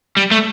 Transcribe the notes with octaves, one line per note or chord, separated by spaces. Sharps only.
G3
A3